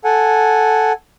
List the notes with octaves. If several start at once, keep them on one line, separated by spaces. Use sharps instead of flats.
A4 F#5 G#5